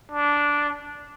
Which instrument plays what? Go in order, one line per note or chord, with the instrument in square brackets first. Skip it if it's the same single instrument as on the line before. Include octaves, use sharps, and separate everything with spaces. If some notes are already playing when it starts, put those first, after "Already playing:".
[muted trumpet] D4